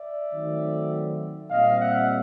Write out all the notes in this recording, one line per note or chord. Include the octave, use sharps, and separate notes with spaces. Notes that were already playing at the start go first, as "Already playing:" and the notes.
Already playing: D5 E5
D#3 F#3 A3 C4
A#2 G3 C4 D#5 F5
E5 F#5